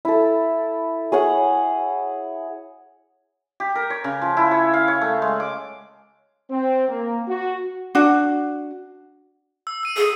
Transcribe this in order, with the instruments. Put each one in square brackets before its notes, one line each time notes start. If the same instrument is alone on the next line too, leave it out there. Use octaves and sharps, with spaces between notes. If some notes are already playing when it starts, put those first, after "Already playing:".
[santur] E4 A4
G#4 C#5 F#5
[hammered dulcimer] G4
A#4
C#5
C#3
F3
E4
C#5
F5
C#5
A3
G#3
D6
[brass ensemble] C4
A#3
F#4
[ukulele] D4 F#4
[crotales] E6
E6 D#7
[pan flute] G#4